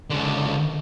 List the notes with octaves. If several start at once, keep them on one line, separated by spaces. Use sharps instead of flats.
C#2 D3